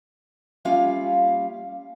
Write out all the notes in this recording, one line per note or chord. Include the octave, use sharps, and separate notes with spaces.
G3 A#3 C#4 F4 E5 F5